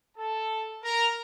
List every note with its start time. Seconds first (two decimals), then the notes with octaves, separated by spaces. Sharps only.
0.17 A4 A5
0.83 A#4 A#5